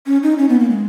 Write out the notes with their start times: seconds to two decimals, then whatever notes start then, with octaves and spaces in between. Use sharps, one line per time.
0.06 C#4
0.23 D#4
0.38 C#4
0.49 B3
0.59 A#3
0.70 G#3